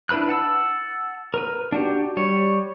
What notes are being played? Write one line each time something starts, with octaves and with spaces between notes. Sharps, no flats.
D4 E4 B4 B5 F#6
F#5 A5 E6
A#4 B4
D4 F#4 G4
G3 C#5